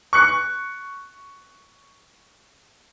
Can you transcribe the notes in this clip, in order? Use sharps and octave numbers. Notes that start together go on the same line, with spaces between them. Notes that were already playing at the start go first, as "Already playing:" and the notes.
C#6 F#6 C#7